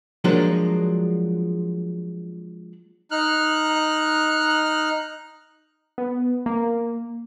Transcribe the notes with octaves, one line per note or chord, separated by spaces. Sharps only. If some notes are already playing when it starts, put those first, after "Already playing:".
F3 F#3 G#3 A#3 D4 F#4
D#4 F6 F#6
B3
A#3